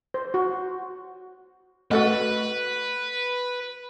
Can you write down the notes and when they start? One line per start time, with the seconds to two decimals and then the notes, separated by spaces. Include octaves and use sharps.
0.14 C5
0.34 F#4
1.91 A3 F#4 A4 B4 D#5